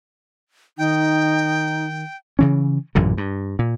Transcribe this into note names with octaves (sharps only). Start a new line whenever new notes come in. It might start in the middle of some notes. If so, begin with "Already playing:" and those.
D#3 D#4 G5
C#3 E3 C#4
A1 F#2 A#2 D3
G2
A#2